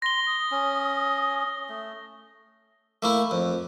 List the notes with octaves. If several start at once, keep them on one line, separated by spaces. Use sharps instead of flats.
C6 A#6 G7
D#6
C#4
A3
A3 A#3 E4
F2